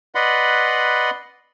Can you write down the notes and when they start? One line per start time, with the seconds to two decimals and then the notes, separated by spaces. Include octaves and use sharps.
0.15 B4 D5 D#5 F#5 B5 C6